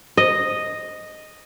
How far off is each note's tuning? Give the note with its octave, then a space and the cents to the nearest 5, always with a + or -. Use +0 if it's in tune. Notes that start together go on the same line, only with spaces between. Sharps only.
D#5 -5